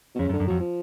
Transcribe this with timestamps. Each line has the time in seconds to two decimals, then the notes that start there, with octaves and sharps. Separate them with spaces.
0.15 B2
0.19 F2 C#3
0.29 F#2
0.33 D3
0.40 F#2
0.47 F2 F#3
0.60 F3